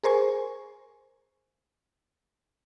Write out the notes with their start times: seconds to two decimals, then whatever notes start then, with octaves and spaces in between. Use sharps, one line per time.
0.03 G#4 A#4 C5 G#5 C#6